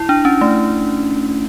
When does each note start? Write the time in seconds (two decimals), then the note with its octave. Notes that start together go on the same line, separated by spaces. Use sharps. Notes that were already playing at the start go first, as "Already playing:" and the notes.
Already playing: E4
0.09 D4
0.25 C#4
0.41 A3